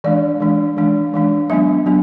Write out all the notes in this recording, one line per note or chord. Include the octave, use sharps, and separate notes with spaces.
E3 G#3 D4 D5
E3 G#3 D4
E3 G#3 D4
E3 G#3 D4
F#3 B3 D4 E5
F#3 B3 D4